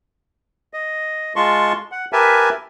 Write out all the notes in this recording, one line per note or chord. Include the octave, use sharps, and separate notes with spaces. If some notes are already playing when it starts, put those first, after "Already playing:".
D#5
G#3 F4 A5 C6 C#6
F#5
G4 A#4 B4 E5 G#5 A5